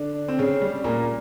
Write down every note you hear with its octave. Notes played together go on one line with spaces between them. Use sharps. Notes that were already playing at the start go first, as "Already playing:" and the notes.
Already playing: D3 D4
C4
C#3 C#4
G3
A#2 A#3